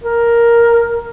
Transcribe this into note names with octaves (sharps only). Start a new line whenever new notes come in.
A#4